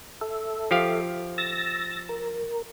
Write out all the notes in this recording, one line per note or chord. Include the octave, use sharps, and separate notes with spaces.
A4 E5
F3 G4 F5
E6 A6 A#6
A#4